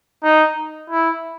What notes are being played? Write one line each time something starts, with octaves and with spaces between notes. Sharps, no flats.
D#4
E4